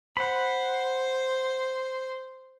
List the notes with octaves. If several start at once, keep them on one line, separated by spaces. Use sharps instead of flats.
C5 F#5 B5